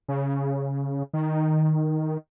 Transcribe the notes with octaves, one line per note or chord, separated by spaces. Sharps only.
C#3
D#3